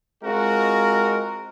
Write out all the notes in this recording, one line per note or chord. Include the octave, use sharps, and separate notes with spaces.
G#3 C4 F4 F#4 A#4